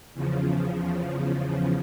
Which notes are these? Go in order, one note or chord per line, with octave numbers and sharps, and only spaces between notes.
E2 C#3 F3